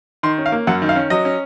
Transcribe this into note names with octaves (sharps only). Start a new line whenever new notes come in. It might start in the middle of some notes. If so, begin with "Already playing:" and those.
D#3 C6
C#4
F5
A#3
F#2 F#5
D#3
F5
C#4
F#3 D#5
C#4